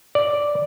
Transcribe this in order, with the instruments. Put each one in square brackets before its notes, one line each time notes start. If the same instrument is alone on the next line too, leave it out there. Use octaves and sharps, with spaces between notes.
[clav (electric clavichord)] D5